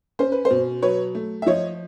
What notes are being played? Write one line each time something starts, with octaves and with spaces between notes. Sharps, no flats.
C#4 C5
B4
C5
B2
F#3 B4 C#5
A3
E5
F3 C#5 D#5